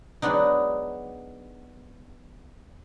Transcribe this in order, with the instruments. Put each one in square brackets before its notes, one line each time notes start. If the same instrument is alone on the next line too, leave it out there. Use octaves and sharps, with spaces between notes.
[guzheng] F#3 G#3 B3 D4 D#4